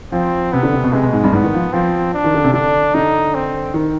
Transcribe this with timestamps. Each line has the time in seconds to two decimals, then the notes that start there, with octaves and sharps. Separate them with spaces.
0.12 F3 C4
0.52 C3 B3
0.63 D3
0.73 C3
0.84 B2
0.93 C3 G#3
1.03 B2
1.13 G#2
1.24 G2
1.33 G#2 B3
1.44 D#3
1.54 F3
1.73 F3 C4
2.14 D4
2.24 D#3
2.34 D3
2.44 C3
2.54 D3 D4
2.94 D3 D#4
3.35 C4
3.74 D#3